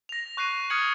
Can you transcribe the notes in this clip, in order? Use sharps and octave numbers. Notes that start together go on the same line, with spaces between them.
A#6 F7
C#6 F#6 A#6 C7 D#7
D#6 F6 G#6 C#7 F#7